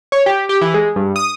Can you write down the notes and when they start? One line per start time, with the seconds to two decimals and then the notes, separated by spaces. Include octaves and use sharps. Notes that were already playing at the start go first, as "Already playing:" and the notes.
0.12 C#5
0.26 G4
0.49 G4
0.61 E3
0.74 G#3
0.96 G2
1.16 D#6